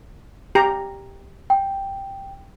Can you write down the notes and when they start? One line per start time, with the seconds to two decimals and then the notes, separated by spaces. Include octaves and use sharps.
0.55 G4 A#5
1.50 G5